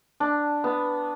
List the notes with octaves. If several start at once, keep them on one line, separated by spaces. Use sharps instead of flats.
D4
B3